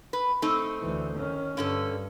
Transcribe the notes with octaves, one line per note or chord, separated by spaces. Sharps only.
B4
A3 C4 D#4
D2 E3
D#3 C#4
G2 D3 C#4 A4